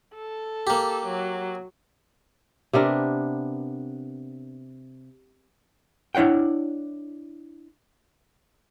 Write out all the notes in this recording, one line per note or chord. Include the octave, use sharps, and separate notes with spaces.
A4
A#3 G4
F#3
C3 B3 D4 A#4
D4 E4 C#5 F#5 G5